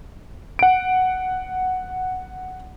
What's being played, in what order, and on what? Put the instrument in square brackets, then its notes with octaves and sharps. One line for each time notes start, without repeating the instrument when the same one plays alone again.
[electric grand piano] F#5 D7